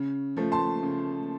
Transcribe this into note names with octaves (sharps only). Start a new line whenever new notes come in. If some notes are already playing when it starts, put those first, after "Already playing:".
Already playing: C#3
F3 A3
A5 C6
C#3